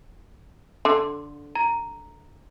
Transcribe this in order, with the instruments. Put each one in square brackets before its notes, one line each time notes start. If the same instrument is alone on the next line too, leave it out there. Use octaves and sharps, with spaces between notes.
[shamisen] D3 [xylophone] C6
[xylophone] A#5